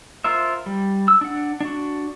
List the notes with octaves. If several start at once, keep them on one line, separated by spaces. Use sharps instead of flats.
F4 A#4 C5 E5
G3
E6
D4 F#5
D4 F#4